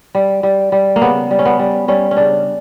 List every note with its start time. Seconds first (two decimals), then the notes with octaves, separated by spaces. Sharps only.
0.15 G3
0.43 G3
0.72 G3
0.96 A#3
1.02 C#3 B3
1.31 G3
1.39 C#4
1.45 B3
1.59 G3
1.88 G3 C#4
2.11 C#4
2.17 C#3 D4